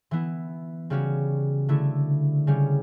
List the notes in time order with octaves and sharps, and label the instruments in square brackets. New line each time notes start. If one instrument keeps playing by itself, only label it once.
[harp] E3 B3 E4
C#3 G3 C#4 F#4
D3 A3 E4
C#3 G3 C#4